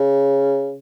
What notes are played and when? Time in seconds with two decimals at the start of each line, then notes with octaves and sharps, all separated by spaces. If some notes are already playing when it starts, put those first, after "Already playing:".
Already playing: C#3